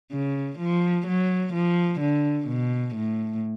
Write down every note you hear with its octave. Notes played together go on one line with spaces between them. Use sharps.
C#3
F3
F#3
F3
D3
B2
A2